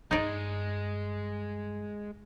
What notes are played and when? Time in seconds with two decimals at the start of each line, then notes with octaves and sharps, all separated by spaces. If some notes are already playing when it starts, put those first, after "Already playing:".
0.11 G2 G3 G#3 D#4 D5